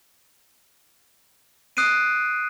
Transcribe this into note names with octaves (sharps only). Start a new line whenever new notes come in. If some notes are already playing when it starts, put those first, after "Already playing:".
D#6 F#6 C7 D7 D#7